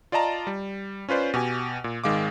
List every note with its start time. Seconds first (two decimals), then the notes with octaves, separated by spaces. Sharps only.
0.12 F4 D5 D#5 A5 A#5
0.47 G3
1.09 C#4 F4 B4 C5 D5
1.34 B2 G4 G#5
1.84 A#2
2.04 G#1 D#3 G#3 F5 D6